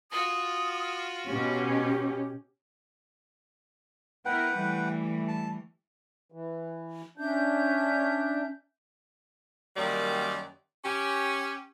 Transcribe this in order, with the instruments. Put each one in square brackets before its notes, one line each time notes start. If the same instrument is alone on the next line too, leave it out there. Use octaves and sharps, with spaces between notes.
[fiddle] F4 F#4 [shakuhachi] D#6
[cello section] B2 C#4 [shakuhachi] G4
[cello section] B3 E4 A#4 [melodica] B4 F#5 G5
[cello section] E3 G3 A3
[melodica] A5
[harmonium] E3
[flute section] C#4 E5 G6 [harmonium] D4
[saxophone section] F#2 D#3 G3 A#3 D5
C#4 G4